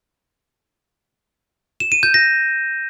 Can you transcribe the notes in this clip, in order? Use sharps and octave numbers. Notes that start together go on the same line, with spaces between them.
E7
D#7
G6
A#6